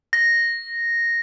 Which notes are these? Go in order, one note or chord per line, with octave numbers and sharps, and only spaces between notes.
A#6